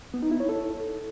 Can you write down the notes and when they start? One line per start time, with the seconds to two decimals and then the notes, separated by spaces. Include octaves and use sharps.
0.14 B3
0.23 D#4
0.31 E4
0.40 C#5
0.49 A4